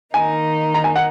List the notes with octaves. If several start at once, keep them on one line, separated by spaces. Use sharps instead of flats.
D#3 A#3 D#4 G#5
A#5
G#5
F#5